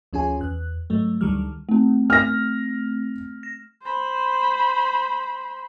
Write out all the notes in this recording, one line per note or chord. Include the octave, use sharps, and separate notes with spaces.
D2 F3 C#4 F4 G#4 G#5
E2 F#6
G#2 F#3 A3
D2 D3 D#3 F#3 G3 F6
A3 C4
F6 A#6
A#6
C5 B5